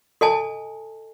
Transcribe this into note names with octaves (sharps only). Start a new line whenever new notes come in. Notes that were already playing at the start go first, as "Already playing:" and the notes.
A4 D#5 G#5 A5